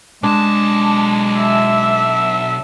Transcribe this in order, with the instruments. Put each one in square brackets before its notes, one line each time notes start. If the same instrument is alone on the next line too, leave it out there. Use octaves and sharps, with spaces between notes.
[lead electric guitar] B1 A5 [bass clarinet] G#3 [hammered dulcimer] D4
[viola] E5